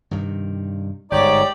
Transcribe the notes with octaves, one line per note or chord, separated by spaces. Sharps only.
G2 C3 D#3
G1 G#2 D#4 G4 C#5 D5